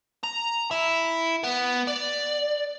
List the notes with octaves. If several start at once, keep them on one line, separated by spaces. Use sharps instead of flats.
A#5
E4
B3
D5